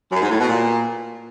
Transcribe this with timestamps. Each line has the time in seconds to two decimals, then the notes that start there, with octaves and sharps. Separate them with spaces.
0.12 F#2
0.21 G#2
0.31 A2
0.40 B2
0.49 A#2